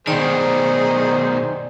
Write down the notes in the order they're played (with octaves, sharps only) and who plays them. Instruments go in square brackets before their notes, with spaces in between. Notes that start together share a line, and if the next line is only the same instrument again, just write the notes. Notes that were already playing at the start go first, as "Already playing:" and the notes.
[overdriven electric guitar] B2 D#3 [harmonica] D#4 G#4 C5 [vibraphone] D5 G5